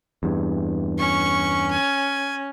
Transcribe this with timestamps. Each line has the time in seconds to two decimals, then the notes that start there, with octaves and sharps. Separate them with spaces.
0.23 E2 G2
0.99 C#4 C#6
1.72 G#5